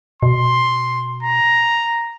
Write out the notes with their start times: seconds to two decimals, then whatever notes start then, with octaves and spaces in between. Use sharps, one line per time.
0.23 B2 C6
1.23 A#5